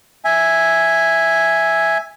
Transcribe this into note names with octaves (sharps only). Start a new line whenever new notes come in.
E5 G#5